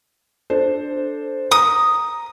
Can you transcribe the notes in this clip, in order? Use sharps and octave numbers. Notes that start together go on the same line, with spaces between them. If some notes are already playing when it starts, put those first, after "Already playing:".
D4 A4 C5
A#5 D#6